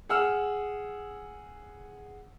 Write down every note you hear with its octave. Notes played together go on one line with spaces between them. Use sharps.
G#4 F#5 E6 F6